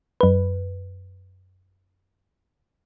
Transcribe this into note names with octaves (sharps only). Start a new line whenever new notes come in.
F#2 B4